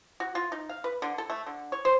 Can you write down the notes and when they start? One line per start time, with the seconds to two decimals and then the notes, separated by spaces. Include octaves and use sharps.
0.20 F#4
0.35 F4
0.52 D#4
0.69 F5
0.84 B4
1.02 D3
1.18 A4
1.30 A3
1.46 D3
1.72 C#5
1.85 C5